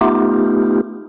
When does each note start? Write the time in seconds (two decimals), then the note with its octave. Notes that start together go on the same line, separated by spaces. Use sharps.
0.01 A3 B3 D#4 F4 G4